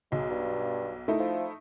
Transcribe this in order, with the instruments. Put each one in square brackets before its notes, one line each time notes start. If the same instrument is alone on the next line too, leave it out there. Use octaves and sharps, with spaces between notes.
[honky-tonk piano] B1 [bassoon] G#3
[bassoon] G2
[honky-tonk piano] A3 D#4 E4
[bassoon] F3